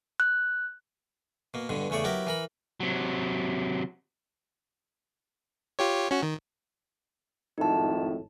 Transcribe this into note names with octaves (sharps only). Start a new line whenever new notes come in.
F#6
B2 A#3
G2 B2 D3
E2 C#3 A3 C#5 D5
F#3 B3 E4 G4 A#4
E3 A#4 B5
C3 F#3
F4 G4 C#5
C#4 F#4
D#3
G#1 F2 A2 D#4 A5